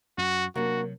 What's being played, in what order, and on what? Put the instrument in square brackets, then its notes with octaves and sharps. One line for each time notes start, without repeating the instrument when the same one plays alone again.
[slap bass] F#2 [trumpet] F#4
[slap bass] C3 F#3 [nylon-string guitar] A#3 D4 [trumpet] F#4